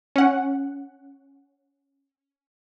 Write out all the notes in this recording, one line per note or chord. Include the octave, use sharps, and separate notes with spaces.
C#4 F#5